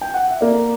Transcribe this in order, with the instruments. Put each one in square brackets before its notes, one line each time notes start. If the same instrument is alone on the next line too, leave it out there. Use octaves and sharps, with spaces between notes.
[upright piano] G5
F#5
E5
[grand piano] A#3 [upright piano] D5